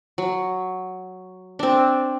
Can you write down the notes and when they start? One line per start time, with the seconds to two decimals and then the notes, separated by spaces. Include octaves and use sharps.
0.18 F#3
1.59 C4 D4